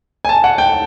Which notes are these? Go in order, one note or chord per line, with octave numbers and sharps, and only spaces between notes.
G#5
A5
F#5
G5